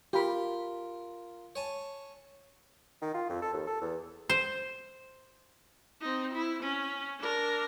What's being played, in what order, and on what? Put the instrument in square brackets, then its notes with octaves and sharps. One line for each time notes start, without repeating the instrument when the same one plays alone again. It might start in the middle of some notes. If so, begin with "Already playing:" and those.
[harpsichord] F4 A#4 [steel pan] G4 B5
[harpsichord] C#5 G#5 A5
[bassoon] D#3
F4
F2
A4
D#2
A4
E2
[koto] C5
[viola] C4 D#4
E4
C#4
D4 A#4